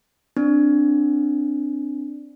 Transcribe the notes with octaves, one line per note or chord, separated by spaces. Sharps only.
C4 D4